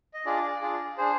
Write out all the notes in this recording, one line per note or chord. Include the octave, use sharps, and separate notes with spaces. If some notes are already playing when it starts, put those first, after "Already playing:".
D#5
D4 F4 G#4 D5
D4 F4 G#4
D4 G#4 C5